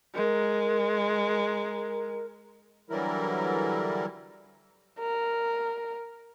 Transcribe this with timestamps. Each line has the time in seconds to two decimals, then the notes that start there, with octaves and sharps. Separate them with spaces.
0.15 G#3 A#4
2.90 D3 E3 F#3 G3 E4 A#4
5.00 A#4